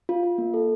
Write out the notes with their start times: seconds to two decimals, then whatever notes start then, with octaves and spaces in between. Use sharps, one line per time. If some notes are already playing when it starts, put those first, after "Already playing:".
0.09 F4
0.23 F4
0.38 A#3
0.54 A4